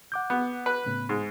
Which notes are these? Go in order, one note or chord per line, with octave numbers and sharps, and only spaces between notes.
F#5 D6 G6
B3
B4
A2 C#3 B3
G#2